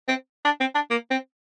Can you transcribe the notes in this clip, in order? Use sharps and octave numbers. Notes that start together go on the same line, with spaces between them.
C4
D4
C4
D4
A#3
C4